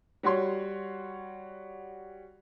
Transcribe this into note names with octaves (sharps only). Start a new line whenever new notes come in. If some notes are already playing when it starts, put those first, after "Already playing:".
G3 F#4 C#5 C6